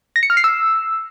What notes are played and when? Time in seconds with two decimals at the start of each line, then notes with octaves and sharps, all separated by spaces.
0.16 A#6
0.23 C#7
0.30 F6
0.37 C7
0.44 E6